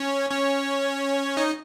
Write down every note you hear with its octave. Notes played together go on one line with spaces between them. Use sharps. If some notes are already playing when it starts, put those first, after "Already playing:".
Already playing: C#4 C#5
C#4 C#5
D#4 D#5